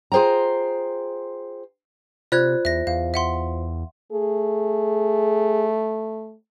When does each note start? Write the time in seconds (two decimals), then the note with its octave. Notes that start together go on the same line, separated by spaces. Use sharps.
0.12 F4 G#4 C5 G5 A#5
2.32 C3 F4 C5 D5 F#6 G#6
2.65 E2 E5 A#6
2.87 E2 F5
3.14 E5 F#5 C6
4.12 A3 G#4